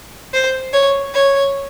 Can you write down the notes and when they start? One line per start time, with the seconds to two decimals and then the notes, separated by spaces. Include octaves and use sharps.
0.33 C5
0.73 C#5
1.14 C#5